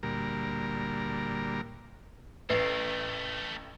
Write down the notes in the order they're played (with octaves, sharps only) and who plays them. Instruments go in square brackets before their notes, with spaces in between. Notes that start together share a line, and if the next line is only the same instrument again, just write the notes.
[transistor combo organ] D2 A#2 G3 A#4
[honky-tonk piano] A1 C7 [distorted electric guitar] A3 A#4 [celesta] B4